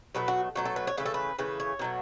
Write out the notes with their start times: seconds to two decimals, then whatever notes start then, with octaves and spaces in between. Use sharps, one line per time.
0.15 B2 F#3 A3 B4
0.28 F#4
0.55 B2 F#3 A3 F#4
0.65 A4
0.76 B4
0.87 C#5
0.97 C#3 E3 A3 B4
1.06 A4
1.14 B4
1.39 C#3 E3 A3 B4
1.60 C#5
1.79 B2 F#3 A3